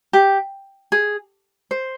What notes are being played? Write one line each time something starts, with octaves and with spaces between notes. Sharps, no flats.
G4
G#4
C5